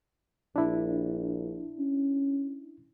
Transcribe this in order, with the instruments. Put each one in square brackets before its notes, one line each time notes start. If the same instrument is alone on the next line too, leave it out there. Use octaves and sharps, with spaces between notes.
[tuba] A#1 [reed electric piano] D4 E4
[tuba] C#4